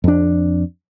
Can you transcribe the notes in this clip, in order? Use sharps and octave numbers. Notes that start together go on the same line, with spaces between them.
F2 D4